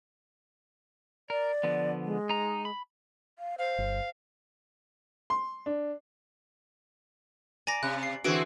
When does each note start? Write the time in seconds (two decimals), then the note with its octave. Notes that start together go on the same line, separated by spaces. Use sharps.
1.30 A#4 D5
1.63 D3 F3 B3
2.05 G#3
2.29 D#4 A#5
2.65 B5
3.39 F5
3.59 C5 F5
3.78 G1
5.30 C6
5.66 D4
7.67 D5 G#5 A#5 A#6
7.83 C3 F#6
8.03 C7
8.24 D3 E3 C4 F#4 G#4 D7